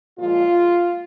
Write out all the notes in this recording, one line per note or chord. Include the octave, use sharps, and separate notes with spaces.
A#2 F3 G#3 F4